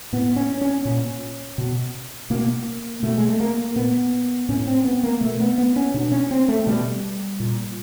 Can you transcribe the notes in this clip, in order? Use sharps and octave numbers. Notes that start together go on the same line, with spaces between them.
A2 B3
C#4
C#4
A#2
B2
B2 A#3
B2 A3
G#3
A3
A#3
A#2 B3
A2 C#4
C4
B3
A#3
B2 A3
B3
B3
C#4
B2 D4
C#4
C4
A3
B2 G3
A#2